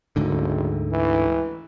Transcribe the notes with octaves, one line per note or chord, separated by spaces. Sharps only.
F#1 D2 G#2 D3
E3